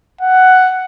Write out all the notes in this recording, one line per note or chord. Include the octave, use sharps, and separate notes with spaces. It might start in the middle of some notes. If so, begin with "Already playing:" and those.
F#5